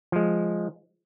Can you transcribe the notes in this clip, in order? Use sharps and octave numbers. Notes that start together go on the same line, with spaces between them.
F3 G#3